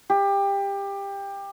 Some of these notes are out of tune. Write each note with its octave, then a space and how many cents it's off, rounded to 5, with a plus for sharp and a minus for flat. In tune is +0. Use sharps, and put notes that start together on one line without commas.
G4 +20